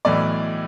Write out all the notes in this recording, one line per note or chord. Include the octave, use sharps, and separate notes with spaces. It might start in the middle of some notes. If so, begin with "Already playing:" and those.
B1 A2 E3 D5